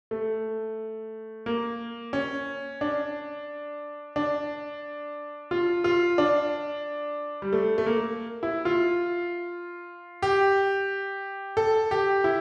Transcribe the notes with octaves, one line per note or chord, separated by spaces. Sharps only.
A3
A#3
C#4
D4
D4
F4
F4
D4
G3
A3
A3
A#3
E4
F4
G4
A4
G4
E4